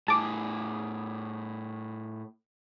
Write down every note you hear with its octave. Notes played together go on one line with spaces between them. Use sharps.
A2 G#4 A5 D6